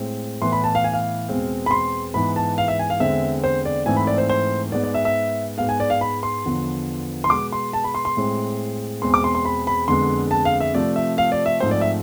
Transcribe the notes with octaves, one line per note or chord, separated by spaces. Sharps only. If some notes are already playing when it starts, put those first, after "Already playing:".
Already playing: A2 G#3 C4
A2 E3 B3 C6
B5
A5
F5
G#5
F5
E2 B2 G#3 C4
B5
C6
G#2 E3 B3 B5
A5
F5
E5
G#5
F5
E2 D3 G#3 C4 E5
C5
D5
G#2 E3 A3 C4 G#5
B5
D5
C5
C5
G#2 G#3 B3 D5
D5
E5
E5
G#2 G#3 B3 F5
G#5
D5
F5
B5
C6
E2 D3 F3 B3
C6
B2 G#3 B3 D6
C6
A5
B5
C6
C6
A2 G#3 C4
E2 B2 G#3 C4 C6
D6
C6
C6
B5
B5
F2 D3 G#3 B3 C6
A5
F5
E5
C3 F3 A3 D5
E5
F5
D5
E5
G#2 F3 A3 C4 C5
D5
E5